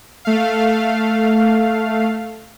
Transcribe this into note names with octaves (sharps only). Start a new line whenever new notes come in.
A3 F5